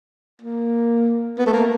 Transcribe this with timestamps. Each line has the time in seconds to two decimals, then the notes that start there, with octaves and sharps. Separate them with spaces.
0.42 A#3
1.38 B3
1.46 A3
1.53 A#3